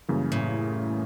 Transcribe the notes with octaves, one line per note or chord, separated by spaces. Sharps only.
F#2 C#3 E3 G3 A#3
A2